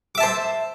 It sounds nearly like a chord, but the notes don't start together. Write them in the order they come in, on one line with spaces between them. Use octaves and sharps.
D6 E5 A5 C5